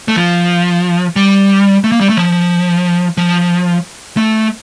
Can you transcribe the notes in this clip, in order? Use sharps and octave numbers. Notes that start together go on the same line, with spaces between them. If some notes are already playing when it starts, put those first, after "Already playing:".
A3
F3
G3
A3
A#3
G3
A3
F3
F3
A3